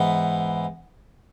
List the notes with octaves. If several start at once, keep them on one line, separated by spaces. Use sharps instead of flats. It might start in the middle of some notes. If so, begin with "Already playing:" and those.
Already playing: G#2 E3 B3